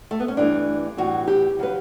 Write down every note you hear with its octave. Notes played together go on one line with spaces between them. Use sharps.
A3
B3
C#4
G2 E3 A3 D4
A2 E3 G3 F#4
G4
C#3 F#3 B4